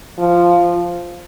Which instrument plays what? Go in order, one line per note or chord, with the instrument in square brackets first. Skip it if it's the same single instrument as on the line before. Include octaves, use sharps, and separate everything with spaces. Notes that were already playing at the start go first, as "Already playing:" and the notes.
[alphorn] F3